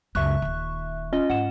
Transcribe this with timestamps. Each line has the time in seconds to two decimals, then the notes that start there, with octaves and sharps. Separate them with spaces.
0.15 C#2 F#2 E5 C#6 F#6
0.42 D#1 D#3
1.13 C#4 F4 D#5
1.30 G#2 F#5 E7